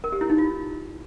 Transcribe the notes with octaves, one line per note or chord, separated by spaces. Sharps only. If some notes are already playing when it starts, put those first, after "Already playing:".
A#4
G4
E4
D#4
F4